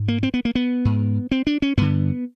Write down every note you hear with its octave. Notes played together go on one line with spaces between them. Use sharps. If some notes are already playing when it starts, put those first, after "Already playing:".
Already playing: G#2
A#3
C4
B3
A#3
B3
G#2
C4
D4
C#4
G2 D3 B3